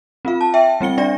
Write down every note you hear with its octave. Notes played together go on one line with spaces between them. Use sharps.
C4 F4 F5
A5
E5 G5
G3 C4 C#7 G7
D4 D5 A#6